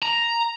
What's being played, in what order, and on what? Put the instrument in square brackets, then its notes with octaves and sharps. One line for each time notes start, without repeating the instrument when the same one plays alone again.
[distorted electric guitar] A#5